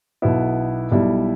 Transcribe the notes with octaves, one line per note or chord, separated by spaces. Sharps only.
B1 B2 B3 E4
B1 B2 G3 E4